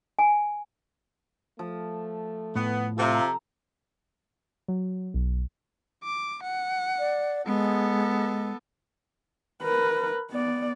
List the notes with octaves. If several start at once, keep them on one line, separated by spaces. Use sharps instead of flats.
G#5
F3 A3
A2 B3
C3 F4 A4 A#5
F#3
B1
D6
F#5
D5
G#3 B3 A4
A#4 B4
B3 D5